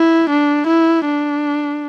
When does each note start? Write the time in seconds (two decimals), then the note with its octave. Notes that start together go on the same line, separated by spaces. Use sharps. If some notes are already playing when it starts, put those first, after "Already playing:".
Already playing: E4
0.30 D4
0.67 E4
1.05 D4